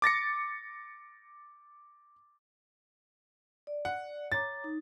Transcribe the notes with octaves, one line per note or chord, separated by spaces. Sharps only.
D6 A6 A#6 C#7
D5
F#5
C#5 A#5 D6 A6
D#4